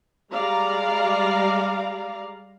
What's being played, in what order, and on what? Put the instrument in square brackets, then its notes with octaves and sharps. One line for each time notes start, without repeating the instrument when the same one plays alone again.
[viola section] G3 G#3 D5 F5 A#5